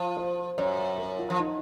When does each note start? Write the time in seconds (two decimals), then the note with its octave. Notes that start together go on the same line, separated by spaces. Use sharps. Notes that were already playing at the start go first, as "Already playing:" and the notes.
Already playing: F3 F4
0.17 C5
0.58 F#2 C#5
0.78 C#5
0.98 A#4
1.19 F4
1.30 F3
1.40 D#4